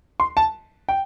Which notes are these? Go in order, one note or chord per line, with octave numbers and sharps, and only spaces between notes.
C6
A5
G5